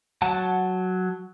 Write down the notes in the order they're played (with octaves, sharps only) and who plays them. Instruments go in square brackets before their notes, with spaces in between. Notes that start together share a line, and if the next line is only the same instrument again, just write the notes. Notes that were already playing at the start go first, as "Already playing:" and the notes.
[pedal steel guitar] F#3 F#5 A5